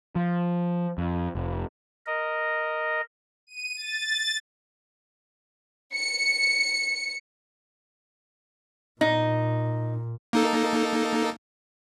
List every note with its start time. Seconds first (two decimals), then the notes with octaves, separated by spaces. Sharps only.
0.16 F3
0.98 F2
1.35 F1
2.06 A#4 D#5
3.47 D#7
3.77 A6
5.95 C#7
9.01 A#2 D#4
10.33 A#3 D#4 A4